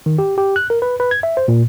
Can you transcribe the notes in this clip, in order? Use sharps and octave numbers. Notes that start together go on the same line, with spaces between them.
D#3
G4
G4
F#6
A#4
B4
B4
G#6
E5
C5
A#2